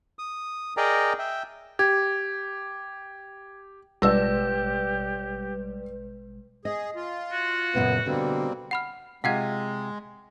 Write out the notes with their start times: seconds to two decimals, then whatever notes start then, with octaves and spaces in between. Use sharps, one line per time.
0.19 D#6
0.77 G#4 A#4 D5 D#5 G5 A#5
1.19 E5 G5
1.79 G4 G#6
4.02 A1 B2 G3 G#3 G4 B4 D5 E6
6.65 G#4 D#5
6.96 F4
7.32 F#4
7.75 F#2 A#2 C#3 B3
8.06 B2 D3 G3 A#3 C4
8.71 F#5 B5 F6
9.24 C3 G#3 F4 F5 F#5 G#5 G#6